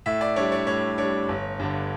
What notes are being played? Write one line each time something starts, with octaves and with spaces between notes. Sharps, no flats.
A2 E5
D5
G3 D4 C#5
C#5
A2 C#5
G3 D4 C#5
G1
G2 D3